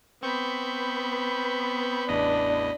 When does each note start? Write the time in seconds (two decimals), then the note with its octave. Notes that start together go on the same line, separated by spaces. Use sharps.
0.23 B3 C4 B5 C#6 G6
2.09 A1 E2 D4 D#5